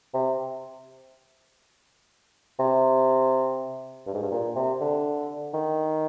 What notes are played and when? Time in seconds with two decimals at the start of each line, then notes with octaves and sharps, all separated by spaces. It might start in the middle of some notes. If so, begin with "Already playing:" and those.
0.14 C3
2.59 C3
4.06 G2
4.14 G#2
4.22 G2
4.31 A#2
4.55 C3
4.80 D3
5.54 D#3